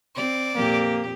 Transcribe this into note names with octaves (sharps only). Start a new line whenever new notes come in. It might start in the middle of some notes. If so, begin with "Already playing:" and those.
C4 D5
F2 A#2 A#3 G4